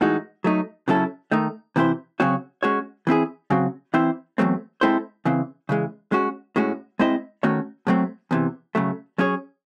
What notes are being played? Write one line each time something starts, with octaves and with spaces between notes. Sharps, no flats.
A2 E3 G#3 D#4 F#4
F#3 A3 D#4
C#3 F#3 C#4 E4 A4
D#3 A3 D#4
C3 E3 C4 E4 C5
C#3 F#3 C4 F#4 C#5
G#3 C#4 F#4 C#5
E3 C4 E4 G#4
C#3 F#3 C4 F#4
E3 C4 E4 C5
E2 C#3 F#3 A3 C4
G#3 C4 E4 A4 C5
C#3 E3 C4
C#3 E3 G#3
G#3 C#4 F#4
A2 G#3 C#4 F#4
G#3 C4 E4 C5 D#5
D#3 A3 C#4 F#4 C#5
A2 F#3 A3 C4
E2 C3 E3
C#3 F#3 A3
F#3 C#4 G#4 C#5